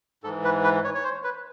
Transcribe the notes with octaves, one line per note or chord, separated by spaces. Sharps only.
G#2 E3 A4
B4
B4
C#5
C#5
C5
B4